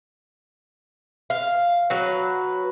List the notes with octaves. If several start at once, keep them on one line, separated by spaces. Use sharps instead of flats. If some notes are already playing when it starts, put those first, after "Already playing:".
F5
F#3 B4